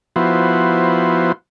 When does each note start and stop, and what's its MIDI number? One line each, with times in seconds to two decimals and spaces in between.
0.16 1.32 53
0.16 1.32 59
0.16 1.32 64
0.16 1.32 66
0.16 1.32 72